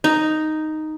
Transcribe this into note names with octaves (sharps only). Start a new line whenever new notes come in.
D#4